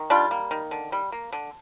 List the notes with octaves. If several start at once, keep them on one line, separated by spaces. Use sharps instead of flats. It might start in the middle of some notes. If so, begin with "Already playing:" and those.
Already playing: D#3
G3 D4 F4
A#3
D#3
D3
G3
A#3
D3